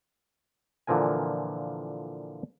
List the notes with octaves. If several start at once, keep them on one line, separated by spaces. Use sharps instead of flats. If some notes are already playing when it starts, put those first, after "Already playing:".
A#2 D3 E3 F3 A#4 G#5